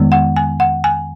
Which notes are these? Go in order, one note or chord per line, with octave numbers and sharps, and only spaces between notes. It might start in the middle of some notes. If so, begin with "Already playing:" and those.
Already playing: F2 D#3 G#3 B3
F#5
G#5
F#5
G#5